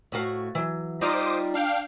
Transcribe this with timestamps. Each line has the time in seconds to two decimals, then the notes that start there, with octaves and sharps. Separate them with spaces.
0.12 A2 F#4 F5
0.55 E3 F#3
1.01 G3 D#4 F4 C5 D6 D#6
1.54 D4 F5 G5